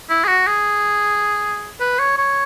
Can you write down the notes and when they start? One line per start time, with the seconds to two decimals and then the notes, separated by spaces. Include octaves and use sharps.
0.10 E4
0.24 G#4
0.28 F#4
0.47 G#4
1.80 B4
1.99 C#5
2.18 C#5